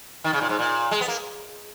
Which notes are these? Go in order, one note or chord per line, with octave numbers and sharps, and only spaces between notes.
D#3
C#3
A#2
G#2
A#2
G#3
B3
A#3